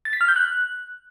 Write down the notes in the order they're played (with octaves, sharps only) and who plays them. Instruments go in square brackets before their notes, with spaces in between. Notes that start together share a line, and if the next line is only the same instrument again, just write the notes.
[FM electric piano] A6
B6
F6
G6
F#6